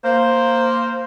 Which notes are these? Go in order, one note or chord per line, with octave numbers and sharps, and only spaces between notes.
A#3 C5